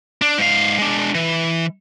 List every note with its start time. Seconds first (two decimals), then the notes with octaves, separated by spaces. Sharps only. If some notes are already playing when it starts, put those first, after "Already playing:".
0.22 D4
0.38 G#2 F5
0.79 G#3 D4
1.15 E3